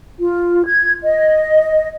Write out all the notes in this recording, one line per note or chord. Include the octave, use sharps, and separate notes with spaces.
F4
G#6
D#5